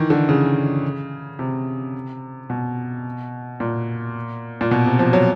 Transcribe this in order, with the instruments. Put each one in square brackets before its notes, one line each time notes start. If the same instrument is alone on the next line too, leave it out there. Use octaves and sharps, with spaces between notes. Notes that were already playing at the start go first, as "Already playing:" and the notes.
Already playing: [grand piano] D#3 E3
D3
C#3
C3
B2
A#2
A#2
B2
C3
F3
F#3